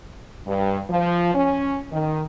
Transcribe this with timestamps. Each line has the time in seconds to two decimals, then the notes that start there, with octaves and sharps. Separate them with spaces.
0.47 G2
0.90 F3
1.35 C#4
1.93 D#3